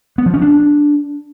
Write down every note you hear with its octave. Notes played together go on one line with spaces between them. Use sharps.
B3
F3
C#4
D4